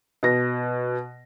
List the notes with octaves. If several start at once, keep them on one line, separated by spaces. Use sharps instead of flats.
B2 A#6